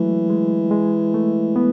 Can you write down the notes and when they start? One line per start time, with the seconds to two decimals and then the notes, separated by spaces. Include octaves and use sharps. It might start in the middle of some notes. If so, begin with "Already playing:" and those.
Already playing: E3 F#3 G#3 A3
0.30 G#3
0.71 G#3
1.14 A3
1.56 B3